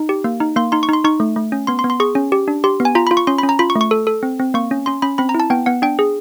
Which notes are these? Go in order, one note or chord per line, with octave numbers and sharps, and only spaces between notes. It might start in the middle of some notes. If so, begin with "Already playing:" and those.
Already playing: D#4
G4
A#3
D#4
A#3 C6
D#4 C6
C#6
D#4 C6
D#4 C#6
A3
A3
C#4
B3 C6
C6
B3
C6
G#4 C#6
C#4
G4
D4
G4 C6
B3
G#5
F4 A#5
B5
F4
C#6
C#4 C6
B5
C#4
A#5
F4 B5
C#6
A3
C#6
A4
A4
C4
C4
A#3 C#6
C#4
C#4 C6
C#4 B5
C4 B5
A#5
E4
A5
B3 G5
B3 F#5
D4 G5
G#4